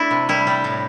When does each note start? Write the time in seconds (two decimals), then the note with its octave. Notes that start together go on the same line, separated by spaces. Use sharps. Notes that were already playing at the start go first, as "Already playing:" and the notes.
Already playing: A3 D4 E4
0.11 C3
0.29 G3 E4
0.47 G3
0.64 A2